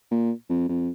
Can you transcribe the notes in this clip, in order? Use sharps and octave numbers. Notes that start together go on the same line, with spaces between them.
A#2
F2
F2